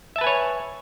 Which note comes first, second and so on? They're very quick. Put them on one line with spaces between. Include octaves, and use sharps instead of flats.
E5 A5 B4 G#5 C#5